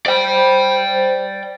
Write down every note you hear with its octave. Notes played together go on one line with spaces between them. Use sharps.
C5 D5 G5